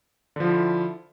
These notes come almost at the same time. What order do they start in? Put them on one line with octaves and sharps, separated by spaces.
D3 F3 F4 E4